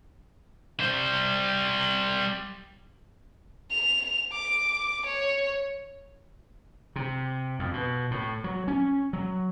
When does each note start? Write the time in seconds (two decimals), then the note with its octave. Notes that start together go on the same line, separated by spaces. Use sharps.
0.80 G3 C5
3.71 F7
4.32 D6
5.05 C#5
6.96 C3
7.59 F2
7.73 B2
8.11 A2
8.44 F#3
8.68 C#4
9.13 F#3